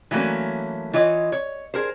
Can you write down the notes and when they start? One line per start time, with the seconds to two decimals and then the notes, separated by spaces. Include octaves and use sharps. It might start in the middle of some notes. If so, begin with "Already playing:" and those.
0.11 E3 F#3 A3 A#3 C#4
0.93 E3 F4 C#5 D#5
1.32 C#5
1.74 G#4 A#4 C5